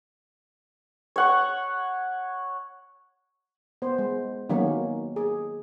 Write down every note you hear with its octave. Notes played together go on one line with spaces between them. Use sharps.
C#5 F#5 C#6
B3 C5
G#3
D#3 F#3 A#3 B3 C#4
G#4